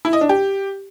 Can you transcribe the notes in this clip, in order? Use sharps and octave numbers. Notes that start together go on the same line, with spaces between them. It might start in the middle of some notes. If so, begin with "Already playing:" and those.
E4
D#5
D4
G4